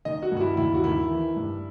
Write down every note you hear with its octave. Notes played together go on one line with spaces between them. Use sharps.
D#3 D#5
F#4
G2
F#4
E4
D#2 E4
F#4
D#3 E4
E3
G2